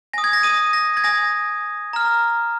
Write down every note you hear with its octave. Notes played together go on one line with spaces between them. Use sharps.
G#5 D#6 A#6
G#6
A#6
D#6 D#7
A#6
G#6
G#5 D#6 A#6
A#5 F6